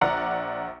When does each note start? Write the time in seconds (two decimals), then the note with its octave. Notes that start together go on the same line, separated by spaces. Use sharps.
0.01 A#1 D5 F#5 A#5